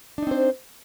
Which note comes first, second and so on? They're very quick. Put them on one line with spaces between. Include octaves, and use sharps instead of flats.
D4 D#4 C4 C5